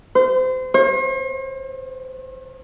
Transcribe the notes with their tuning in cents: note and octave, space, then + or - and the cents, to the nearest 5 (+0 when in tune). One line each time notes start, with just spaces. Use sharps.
C5 -30
C5 +45